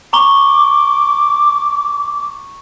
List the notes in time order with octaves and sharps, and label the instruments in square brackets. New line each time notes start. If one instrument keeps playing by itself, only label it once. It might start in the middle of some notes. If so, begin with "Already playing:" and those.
[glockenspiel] A#5 C#6 G7 [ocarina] D6